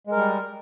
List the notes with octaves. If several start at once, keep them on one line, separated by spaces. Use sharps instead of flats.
G3 G#3 A#4